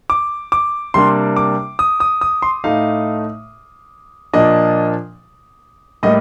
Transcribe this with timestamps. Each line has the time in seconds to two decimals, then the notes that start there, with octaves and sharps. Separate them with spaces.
0.10 D6
0.52 D6
0.94 C3 G3 A#3 D4 C6
1.36 D6
1.79 D#6
2.00 D#6
2.21 D#6
2.42 C6
2.64 A2 A3 D#4 F5
4.33 A#2 F3 A#3 D4 D#5
6.03 A2 G3 A#3 D#5